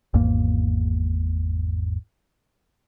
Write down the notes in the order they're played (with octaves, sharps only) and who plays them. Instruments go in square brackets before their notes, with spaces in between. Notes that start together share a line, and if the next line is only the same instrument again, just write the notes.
[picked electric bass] G#1 E2 G#2 A#3